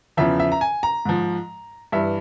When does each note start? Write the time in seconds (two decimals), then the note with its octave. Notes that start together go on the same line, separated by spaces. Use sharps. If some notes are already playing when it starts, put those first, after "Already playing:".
0.17 E2 C#3 F3 E5
0.40 E5
0.52 A#5
0.61 G#5
0.83 A#5
1.05 G#2 F3
1.92 G2 E3 E5